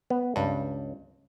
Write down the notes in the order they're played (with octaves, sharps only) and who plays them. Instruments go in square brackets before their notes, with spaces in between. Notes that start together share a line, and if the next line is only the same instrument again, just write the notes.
[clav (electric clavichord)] B3
[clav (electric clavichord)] C#2 [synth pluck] G2